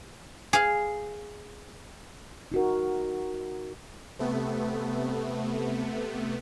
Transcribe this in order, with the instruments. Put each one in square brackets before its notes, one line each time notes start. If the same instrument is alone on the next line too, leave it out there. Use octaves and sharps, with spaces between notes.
[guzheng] G#4 F5
[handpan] D#4 F#4 A#4
[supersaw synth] C3 A3 B3